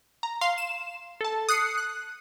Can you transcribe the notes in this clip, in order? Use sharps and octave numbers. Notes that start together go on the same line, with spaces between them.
A#5
F5 C6 C7
E7
A4 A5
D#6 F#6 C7 C#7
F#6